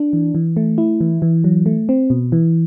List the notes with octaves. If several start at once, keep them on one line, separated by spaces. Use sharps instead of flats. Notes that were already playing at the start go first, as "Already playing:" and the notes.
Already playing: D4
E3
E3
A3
E4
E3
E3
F#3
A3
C4
B2
E3